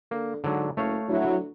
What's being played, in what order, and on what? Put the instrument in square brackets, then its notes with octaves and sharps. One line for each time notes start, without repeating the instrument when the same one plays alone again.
[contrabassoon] D3 [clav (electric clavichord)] A#3
[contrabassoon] G#2 [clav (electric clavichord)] D3 F#3
[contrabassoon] F#1 [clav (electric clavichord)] A3 C#5 F5
[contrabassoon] D2 [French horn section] F#3 E4